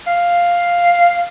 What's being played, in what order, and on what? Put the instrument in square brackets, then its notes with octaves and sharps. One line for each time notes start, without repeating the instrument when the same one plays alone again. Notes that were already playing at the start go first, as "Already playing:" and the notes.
[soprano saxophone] F5